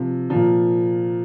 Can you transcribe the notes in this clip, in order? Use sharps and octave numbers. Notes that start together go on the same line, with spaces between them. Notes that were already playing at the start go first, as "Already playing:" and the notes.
Already playing: C3 F3
A#2 F3